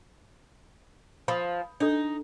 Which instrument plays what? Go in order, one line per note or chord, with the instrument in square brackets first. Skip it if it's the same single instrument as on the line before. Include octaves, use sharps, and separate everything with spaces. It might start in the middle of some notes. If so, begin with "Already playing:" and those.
[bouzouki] F3 [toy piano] B5 D#6
[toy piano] D4 A4 [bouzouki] D#4